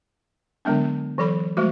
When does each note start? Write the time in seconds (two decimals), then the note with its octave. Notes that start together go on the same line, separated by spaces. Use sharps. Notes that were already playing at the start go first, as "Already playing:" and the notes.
0.65 D3 F#3 G#3 B3 D4
1.18 E3 F#3 A4 B5
1.57 F3 G#3 A3 F#4